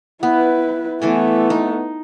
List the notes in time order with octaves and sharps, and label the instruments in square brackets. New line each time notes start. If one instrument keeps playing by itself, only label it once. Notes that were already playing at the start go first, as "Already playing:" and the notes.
[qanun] B3 [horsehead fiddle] E4 B4
[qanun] E3 A4 G#5 [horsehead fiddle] A3 B3
[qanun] D#4